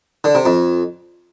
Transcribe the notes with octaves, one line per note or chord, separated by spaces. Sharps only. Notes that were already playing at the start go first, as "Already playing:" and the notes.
D3
C3
F2